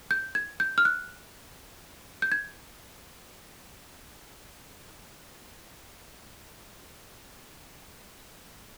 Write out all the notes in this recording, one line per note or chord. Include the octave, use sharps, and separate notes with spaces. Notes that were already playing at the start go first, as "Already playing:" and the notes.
G6
G#6
G6
F6
F#6
G6
G#6